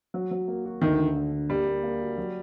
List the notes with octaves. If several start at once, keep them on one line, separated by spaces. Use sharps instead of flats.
F#3
F#3
A#3
F#4
D2 D#3
D3
D3
D3
G3 A#3
A#3
A#3
F#4
F#3